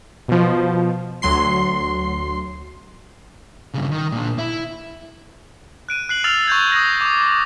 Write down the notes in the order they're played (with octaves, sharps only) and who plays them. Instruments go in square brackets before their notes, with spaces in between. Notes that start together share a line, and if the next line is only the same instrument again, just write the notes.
[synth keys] B2 F3
D2 F#3 C6 C7
[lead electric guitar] G2 C#3
D#3
A#2 D4
E4
[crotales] F#6 D7 D#7
F#6 C7 F#7
E6 F6 A6 C7 F7
C#6 G6 G#6
D#6 G6 A#6
D6 D#6